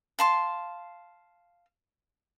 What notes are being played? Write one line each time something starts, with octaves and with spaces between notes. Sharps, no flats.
F5 A5 C6